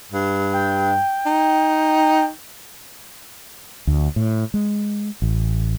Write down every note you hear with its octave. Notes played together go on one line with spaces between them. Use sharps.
G2
G5
D#4
D2
A2
G#3
A1